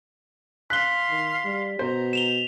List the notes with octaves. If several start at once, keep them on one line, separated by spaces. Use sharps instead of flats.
F5 C6 F#6 B6 G7
D#3
G3
B2 C5 A#5
E7 F7 G7